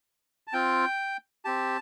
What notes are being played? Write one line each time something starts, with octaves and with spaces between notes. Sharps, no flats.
A5
C4 F4 G5
C4 G4 A5